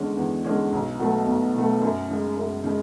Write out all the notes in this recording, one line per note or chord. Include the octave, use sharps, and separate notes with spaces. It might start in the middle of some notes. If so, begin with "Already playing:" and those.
Already playing: E2 D3 G#3 C#4
E2
D3 G#3 C#4
B1
B2 F#3 A3
B1
B2 F#3 A3
F#2
C#3 G#3
F#2
C#3 G#3